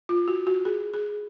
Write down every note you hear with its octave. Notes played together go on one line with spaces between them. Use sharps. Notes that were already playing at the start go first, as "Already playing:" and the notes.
F4
F#4
F#4
G#4
G#4